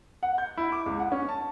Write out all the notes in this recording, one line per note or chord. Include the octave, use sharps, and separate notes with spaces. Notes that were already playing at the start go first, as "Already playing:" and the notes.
F#5
G6
E4
D6
C#2
F#5
C#4
A5